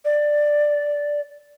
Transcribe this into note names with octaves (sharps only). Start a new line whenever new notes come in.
D5